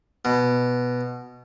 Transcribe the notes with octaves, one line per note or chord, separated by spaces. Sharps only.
B2